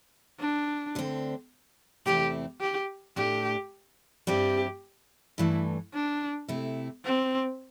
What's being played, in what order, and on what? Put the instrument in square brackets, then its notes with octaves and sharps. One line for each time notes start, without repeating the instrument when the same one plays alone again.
[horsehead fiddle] D4
[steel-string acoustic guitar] D2 D3 C4
[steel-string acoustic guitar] E2 C3 A3 C4 E4 [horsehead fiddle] G4
[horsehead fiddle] G4
[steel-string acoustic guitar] A2 A3 D4 [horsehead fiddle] G4
[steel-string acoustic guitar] G2 G3 C4 E4 [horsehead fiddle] G4
[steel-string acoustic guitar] G2 E3 A3 [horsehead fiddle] E4
[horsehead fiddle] D4
[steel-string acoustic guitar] C3 A3 E4
[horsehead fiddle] C4